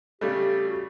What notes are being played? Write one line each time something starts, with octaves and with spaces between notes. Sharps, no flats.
C#3 G3 A3 G4
F#4